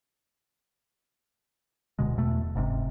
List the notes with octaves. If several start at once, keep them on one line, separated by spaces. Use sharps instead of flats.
D1 B2 D3 G#3
E2 B2 A3
F#1 G#2 C3